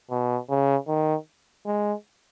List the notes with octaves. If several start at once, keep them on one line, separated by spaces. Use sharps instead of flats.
B2
C#3
D#3
G#3